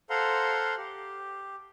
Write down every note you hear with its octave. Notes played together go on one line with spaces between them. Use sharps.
A4 C5 F5 F#5 A#5 C6
G4